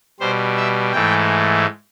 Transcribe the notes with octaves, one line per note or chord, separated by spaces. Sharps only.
B2 G3 C5
E5
G#2 E3 A3 G5